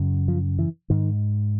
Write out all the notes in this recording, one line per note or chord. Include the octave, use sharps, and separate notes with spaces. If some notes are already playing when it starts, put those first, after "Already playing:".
Already playing: F#2 C#3
F3
E3
G#2 D#3